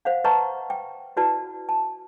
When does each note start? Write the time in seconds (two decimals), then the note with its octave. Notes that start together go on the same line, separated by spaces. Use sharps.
0.05 C5 F5 F#5
0.24 B4 D#5 F#5 A5 A#5 C#6
0.70 G5
1.17 E4 F#4 B4 D5 A5
1.69 A5